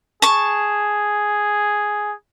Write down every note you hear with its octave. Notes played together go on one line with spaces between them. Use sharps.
G#4 A5 C#6